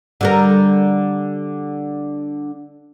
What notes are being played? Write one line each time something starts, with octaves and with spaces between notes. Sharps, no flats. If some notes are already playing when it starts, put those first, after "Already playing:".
D3 G3 A#4